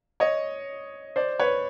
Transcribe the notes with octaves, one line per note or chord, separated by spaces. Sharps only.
C#5 D#5
C5 D5
B4 C#5